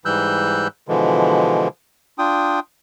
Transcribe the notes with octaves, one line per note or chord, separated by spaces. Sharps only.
G#2 E3 G3 E6 F#6 G6
B2 D3 E3 F3 G#3
D4 F4 G5 D#6